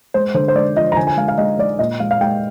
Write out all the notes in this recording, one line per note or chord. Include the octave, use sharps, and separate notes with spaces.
G#3 C5
D3 C5
C5
G#3 D5
F3 D#5
A#5
D3 G#5
G#5
G#3 F5
F5
G#3 D#5
G#3 D5
A#2 D#5
G#3 F5
F5
G#3 G5